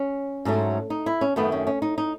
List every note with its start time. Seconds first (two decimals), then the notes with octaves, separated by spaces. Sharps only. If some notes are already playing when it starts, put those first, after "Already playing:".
Already playing: C#4
0.45 G#2 F#3 A3
0.90 D#4
1.06 E4
1.21 C#4
1.36 F#2 D#3 A3 B3
1.52 C#4
1.67 C#4
1.82 D#4
1.98 D#4